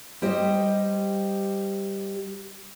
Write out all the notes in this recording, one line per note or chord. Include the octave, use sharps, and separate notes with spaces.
G3 G4 C5 D#5